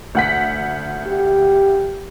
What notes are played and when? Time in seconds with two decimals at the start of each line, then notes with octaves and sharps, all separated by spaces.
0.15 D2 F#5 B6
1.07 G4